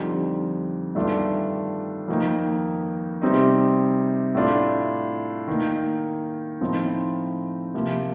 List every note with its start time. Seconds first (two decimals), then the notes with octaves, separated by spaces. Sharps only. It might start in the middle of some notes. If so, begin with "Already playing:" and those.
Already playing: F2 D3 G3 C4 D#4
0.95 G2 D#3 A3 D4 F4
2.08 F2 D#3 A#3 D#4
3.22 C3 G3 C4 D#4
4.35 A2 A3 D4 F4
5.48 D#3 A#3 D#4
6.61 A2 F3 C4 D#4
7.74 C3 F3 A#3